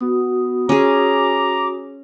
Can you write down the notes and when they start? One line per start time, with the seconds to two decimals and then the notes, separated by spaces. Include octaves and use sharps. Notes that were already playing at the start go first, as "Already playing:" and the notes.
0.01 B3 F#4 D#6
0.69 C#4 G#4 A#5 D6